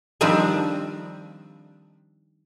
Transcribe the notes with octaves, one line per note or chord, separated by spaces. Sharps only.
D#3 F3 G3 C4 D4